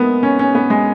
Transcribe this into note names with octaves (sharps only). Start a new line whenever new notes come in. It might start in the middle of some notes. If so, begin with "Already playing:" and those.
Already playing: G#3 A#3 B3
C#4
C#4
B3
G#3